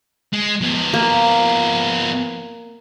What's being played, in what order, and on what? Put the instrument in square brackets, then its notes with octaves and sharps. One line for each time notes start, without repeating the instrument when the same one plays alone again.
[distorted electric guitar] G#3
F3 B3
[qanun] A#3